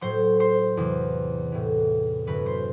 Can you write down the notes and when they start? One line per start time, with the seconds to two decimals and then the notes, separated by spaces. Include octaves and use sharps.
0.01 A2 F#3 C5 C6
0.40 C5 C6
0.77 E2 C3 E3
1.52 A2 E3
2.27 F#2 D3 F#3 B4 B5
2.46 C5 C6